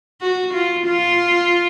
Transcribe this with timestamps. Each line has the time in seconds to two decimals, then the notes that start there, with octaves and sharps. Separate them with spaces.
0.21 F#4
0.54 F4
0.86 F4